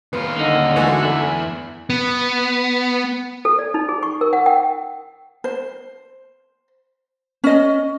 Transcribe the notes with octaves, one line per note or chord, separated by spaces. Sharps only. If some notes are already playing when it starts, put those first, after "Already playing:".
D#2 B3 F4
D3 A#3 D#4
E3 G#3 A3 F#4
E2 E4
B3
A4
D5
D#4
G#4
C#6
A#4
F#5
G5
C5
C#4 D#5